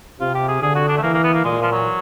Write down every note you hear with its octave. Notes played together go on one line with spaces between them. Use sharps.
C3 F4
G4
G#4
D3 G#4
F#4
D4
A3
E3 A#3
A#3
B3
A#3
A#2 G#3
F3
F#3